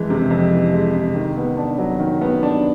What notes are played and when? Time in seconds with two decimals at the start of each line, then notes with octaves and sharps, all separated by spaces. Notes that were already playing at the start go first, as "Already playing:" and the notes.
Already playing: F2 E3 G#3
0.10 C3
0.30 F2
0.51 E3
0.74 G#3
0.94 C3
1.15 D#3
1.37 B3
1.57 D4
1.78 F#3
2.00 D#3
2.22 B3
2.43 D4